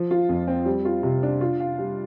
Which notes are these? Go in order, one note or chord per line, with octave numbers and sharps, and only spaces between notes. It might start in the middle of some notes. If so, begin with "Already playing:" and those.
Already playing: F3
F4
F2
C4
G3
F4
C3
D4
F4
F5
G3